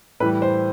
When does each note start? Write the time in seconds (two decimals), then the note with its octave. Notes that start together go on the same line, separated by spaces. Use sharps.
0.20 A2 E3 G3 B4
0.42 C5